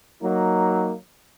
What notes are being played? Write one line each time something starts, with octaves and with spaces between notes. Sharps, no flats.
F#3 A#3 D#4